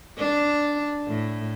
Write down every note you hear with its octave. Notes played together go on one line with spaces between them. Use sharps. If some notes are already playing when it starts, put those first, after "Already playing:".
D4
A2